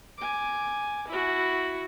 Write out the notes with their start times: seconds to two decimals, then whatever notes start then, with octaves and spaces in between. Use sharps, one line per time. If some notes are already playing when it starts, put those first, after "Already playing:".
0.18 G#5 D6
1.08 E4 F#4